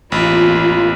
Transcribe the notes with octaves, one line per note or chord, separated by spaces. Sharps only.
A1 E2 A#3 F4 B5